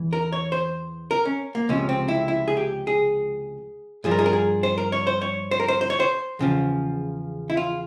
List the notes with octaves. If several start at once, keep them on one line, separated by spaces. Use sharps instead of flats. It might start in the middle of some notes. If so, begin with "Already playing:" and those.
Already playing: E2 E3
A#4
C#5
C5
A#4
C#4
A#3
C#2 C3 F3 C#4
C4
E4
E4
G#4
G4
G#4
G2 F3 G#4
A#4
G#4
A#4
G#4
C5
A#4
C#5
C5
C#5
C5
A#4
C5
C5
C#5
C5
E2 C#3 F3
E4
F4